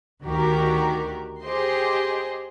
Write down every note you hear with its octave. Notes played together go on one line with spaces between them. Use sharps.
D2 D#3 F#4 G4 A#4
G4 G#4 C5 D#5 C6